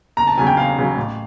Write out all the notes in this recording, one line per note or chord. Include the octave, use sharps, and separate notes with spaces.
F#1 A#5
A5
E2 C#3 F#3 G#5
G5
F#1 F5
E2 C#3 F#3
A1